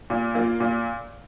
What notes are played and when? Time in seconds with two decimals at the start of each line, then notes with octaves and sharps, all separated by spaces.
0.10 A#2
0.35 A#3 F4
0.60 A#2